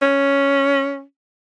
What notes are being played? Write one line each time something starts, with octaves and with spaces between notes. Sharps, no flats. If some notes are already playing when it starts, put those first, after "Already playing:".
C#4